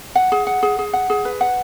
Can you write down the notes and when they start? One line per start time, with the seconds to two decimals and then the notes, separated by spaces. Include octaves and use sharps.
0.15 F#5
0.32 G#4
0.47 F#5
0.63 G#4
0.79 G#4
0.93 F#5
1.10 G#4
1.25 B4
1.41 F#5